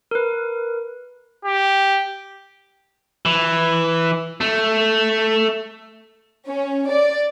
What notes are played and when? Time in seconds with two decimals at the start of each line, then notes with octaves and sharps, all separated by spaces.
0.11 A#4 B4
1.45 G4
3.25 E3
4.41 A3
6.47 C#4
6.90 D5